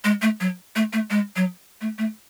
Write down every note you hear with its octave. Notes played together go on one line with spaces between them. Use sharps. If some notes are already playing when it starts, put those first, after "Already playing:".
G#3
A3
F#3
A3
A3
G#3
F#3
A3
A3